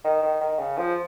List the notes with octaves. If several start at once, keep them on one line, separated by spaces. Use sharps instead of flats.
D#3
D#3
D#3
C#3
F3